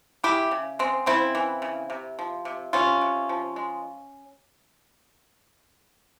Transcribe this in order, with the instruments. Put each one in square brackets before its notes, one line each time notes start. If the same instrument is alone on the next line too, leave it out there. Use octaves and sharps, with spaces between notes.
[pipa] G#3 E4 G4
C#3
G#3 C4
C#3 C4 E4
E3
C#3
C3
F3
C3
C3 C#4 F4
C3
F3
G#3